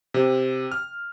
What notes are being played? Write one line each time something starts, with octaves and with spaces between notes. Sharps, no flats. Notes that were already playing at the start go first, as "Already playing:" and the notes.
C3
F6